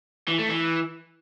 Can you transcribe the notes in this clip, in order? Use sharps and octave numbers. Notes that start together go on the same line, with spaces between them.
E3
A3
E3